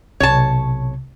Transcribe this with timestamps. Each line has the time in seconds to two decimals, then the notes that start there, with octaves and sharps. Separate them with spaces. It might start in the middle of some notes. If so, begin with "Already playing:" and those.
0.20 B1 C3 C#5 A5